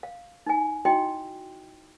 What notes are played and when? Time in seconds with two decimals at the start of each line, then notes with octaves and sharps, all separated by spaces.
0.03 F5
0.46 D#4 G#5
0.85 D#4 E4 F#4 D#5 G5 C6